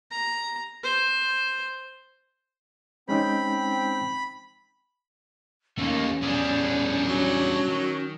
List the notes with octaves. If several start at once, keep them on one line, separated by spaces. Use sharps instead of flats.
A#5
C5
G#3 C4 C#4 D#4 G5 B5
D#2 A3 A#3 C#4
E2 G3 D4 G#4
F#3
D#3